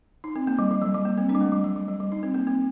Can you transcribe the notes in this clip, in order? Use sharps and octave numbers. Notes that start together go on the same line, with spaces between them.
D#4
C4
A#3
G3
G3
F#3
G3
A#3
C4
D4
G3
A3
G3
F#3
G3
F#3
G3
D#4
C4
A#3
C4